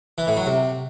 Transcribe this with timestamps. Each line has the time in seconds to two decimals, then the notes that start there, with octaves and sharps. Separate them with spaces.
0.18 E3
0.27 A2
0.37 F#3
0.46 C3